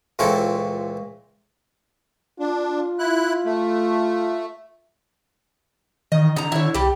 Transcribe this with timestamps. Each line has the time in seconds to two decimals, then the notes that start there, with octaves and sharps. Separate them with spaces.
0.19 C#2 A#2 E3 C4 A4 C#5
2.40 D4 F4
2.99 E4 F#6
3.45 A3
6.12 D#3 E3 D#5
6.36 D3 D#4 A#5
6.52 D#3 E4 C#5
6.74 C2 G3 G4